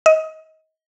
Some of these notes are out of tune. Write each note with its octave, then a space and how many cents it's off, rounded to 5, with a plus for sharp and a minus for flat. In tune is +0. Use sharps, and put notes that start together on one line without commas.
D#5 +25